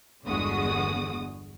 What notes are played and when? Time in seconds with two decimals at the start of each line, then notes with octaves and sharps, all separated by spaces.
0.25 G1 E2 D3 G#3 F#4 D#6